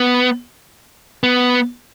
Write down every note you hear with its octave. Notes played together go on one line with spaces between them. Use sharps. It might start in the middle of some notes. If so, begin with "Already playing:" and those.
Already playing: B3
B3